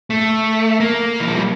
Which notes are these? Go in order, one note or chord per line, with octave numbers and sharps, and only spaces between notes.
A3
A#3
E3
F3
G3